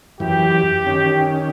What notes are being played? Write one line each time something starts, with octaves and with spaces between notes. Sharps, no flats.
F#2 E3 G4
D#3 C#4